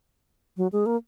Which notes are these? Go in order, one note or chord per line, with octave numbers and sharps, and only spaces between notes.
F#3
G#3
A#3